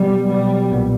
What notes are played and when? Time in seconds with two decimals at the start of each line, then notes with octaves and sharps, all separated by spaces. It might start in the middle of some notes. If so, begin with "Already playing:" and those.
Already playing: B2 F#3 G3 B3
0.29 B2 F#3 G3 B3
0.71 B1 A#2 G3 B3